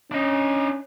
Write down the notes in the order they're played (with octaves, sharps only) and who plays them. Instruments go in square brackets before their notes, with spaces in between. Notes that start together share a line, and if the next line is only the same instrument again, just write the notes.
[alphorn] C#4 [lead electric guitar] D4 D#5